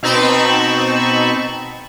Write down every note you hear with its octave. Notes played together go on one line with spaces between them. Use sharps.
B2 C4 D#4 A5 B5 C#6